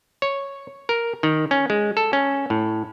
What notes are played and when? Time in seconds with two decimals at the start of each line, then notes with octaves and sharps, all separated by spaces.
0.22 C#5
0.89 A#4
1.23 D#3
1.51 C#4
1.70 G#3
1.97 A4
2.13 C#4
2.50 A2